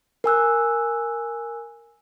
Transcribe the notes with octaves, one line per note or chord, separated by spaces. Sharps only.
A#4 G#5 E6 F#6